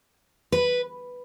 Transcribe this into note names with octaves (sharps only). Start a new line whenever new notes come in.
B4